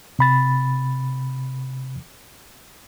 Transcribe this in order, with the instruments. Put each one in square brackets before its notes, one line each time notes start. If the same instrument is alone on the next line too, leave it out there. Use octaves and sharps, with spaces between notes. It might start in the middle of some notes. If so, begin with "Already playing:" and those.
[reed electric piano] C3 B5 A6